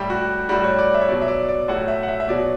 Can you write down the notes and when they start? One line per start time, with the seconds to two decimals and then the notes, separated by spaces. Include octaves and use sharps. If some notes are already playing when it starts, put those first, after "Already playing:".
Already playing: A2 G3 G4
0.10 F#4
0.49 A2 G3 F#4
0.64 C#5
0.78 D5
0.94 E5
1.01 C#5
1.09 B2 F#3 D5
1.22 E5
1.28 D5
1.49 D5
1.68 A2 F#3 F#5
1.88 E5
2.03 F#5
2.08 E5
2.20 E5
2.28 B2 F#3 D5